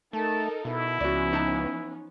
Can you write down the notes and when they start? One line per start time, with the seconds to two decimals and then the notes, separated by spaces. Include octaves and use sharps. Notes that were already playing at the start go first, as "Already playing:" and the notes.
0.13 A3 D#4 A4 A#4 A5
0.65 B2 E4
1.00 C#2 F3 B3 C#4 F#4 D5
1.33 D#4 A5